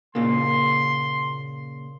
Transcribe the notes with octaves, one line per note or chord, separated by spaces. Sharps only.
A#2 C#3 A#3 C6